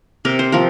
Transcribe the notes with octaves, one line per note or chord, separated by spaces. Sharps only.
C3 A#4
C5
F3 C4 A#4